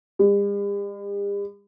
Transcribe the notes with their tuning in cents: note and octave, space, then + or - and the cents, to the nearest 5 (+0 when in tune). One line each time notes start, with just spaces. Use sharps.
G3 +45